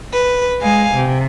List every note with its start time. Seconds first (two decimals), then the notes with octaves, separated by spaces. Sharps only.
0.13 B4
0.61 G#3 F5 G#5
0.96 C3